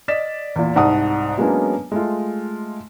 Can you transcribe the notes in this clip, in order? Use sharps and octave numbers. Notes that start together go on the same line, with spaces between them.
D5 D#5 A6 B6 E7
E2 A#2
C2 G#2 D5 F#5 A5 D#6
F#3 G#3 A#3 B3 C#4 D4
G#3 A3 F4